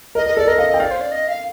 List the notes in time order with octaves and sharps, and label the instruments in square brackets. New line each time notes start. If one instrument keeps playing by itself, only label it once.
[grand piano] A#4 [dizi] D#5
[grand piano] A#4 [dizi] D#5
[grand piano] A4 [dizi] D5
[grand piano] A#4 [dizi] D#5
[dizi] D#5 [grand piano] F5
[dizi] D#5
[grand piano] G5
[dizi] D5 [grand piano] F5
[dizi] C5
D5
D#5
F5